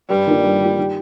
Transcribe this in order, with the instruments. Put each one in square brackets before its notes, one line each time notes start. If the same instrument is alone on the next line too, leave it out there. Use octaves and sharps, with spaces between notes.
[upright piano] G2 [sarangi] G3
[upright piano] D#3 A#3 D4 F4
G2
D#3 A#3 D4 F4
D#3